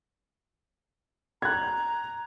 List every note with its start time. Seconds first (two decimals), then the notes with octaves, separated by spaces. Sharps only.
1.42 A#5 F#6 G#6